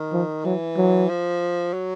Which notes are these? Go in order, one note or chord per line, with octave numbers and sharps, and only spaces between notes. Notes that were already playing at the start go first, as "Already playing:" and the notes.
Already playing: D#3
F3
E3 F#3
F#3
F3
F#3